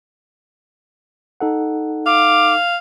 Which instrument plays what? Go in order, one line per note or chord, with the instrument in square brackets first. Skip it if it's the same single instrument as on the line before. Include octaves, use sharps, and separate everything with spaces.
[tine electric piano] D#4 A4 F#5
[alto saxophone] F5 [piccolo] D6